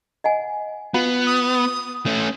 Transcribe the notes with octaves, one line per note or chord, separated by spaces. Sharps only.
D#5 F#5 G#5
B3 F4 F5 F#5
D#6
A3 C#4